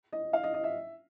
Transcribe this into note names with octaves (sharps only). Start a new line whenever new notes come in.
D#5
F5
D#5
D#5
E5